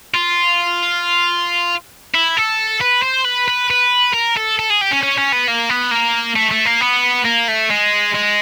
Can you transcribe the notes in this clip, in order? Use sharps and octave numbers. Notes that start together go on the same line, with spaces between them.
F4
E4
A4
B4
C5
B4
B4
B4
A#4
A4
A4
G#4
G4
C#4
C#4
C#4
B3
A#3
B3
A#3
A3
A3
A#3
B3
A#3
A3
G#3
G#3